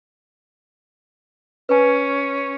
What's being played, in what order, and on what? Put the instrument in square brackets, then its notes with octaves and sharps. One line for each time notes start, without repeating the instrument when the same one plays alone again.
[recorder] C#4 [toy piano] B4 G#5